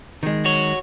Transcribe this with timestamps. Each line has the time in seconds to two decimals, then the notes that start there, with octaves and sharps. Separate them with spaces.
0.23 D#3 G#3
0.45 F#4 C#5